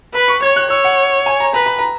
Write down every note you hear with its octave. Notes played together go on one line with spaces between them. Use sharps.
B4 B5
C#6
C#5 G#6
F#6
C#5 E6
F#5
G#5
A#5
B4 A#5
B5
A#5